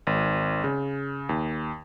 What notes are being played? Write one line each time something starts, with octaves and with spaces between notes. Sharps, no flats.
G#1
C#3
D#2